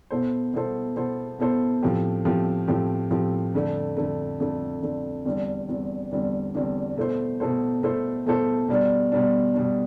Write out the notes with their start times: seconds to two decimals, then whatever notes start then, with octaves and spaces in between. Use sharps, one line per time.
0.10 B2 B3 E4 A4 C5
0.53 B2 B3 E4 A4 C5
0.96 B2 B3 E4 A4 C5
1.39 B2 B3 E4 A4 C5
1.83 A2 F3 A3 C4 G4
2.25 A2 F3 A3 C4 G4
2.68 A2 F3 A3 C4 G4
3.11 A2 F3 A3 C4 G4
3.54 F2 D3 A3
3.97 F2 D3 A3
4.40 F2 D3 A3
4.82 F2 D3 A3
5.25 E2 D3 G3 C4
5.68 E2 D3 G3 C4
6.11 E2 D3 G3 C4
6.54 E2 D3 G3 C4
6.97 B2 A3 E4 A4 C5
7.40 B2 A3 E4 A4 C5
7.83 B2 A3 E4 A4 C5
8.26 B2 A3 E4 A4 C5
8.69 B2 G3 D4
9.12 B2 G3 D4
9.54 B2 G3 D4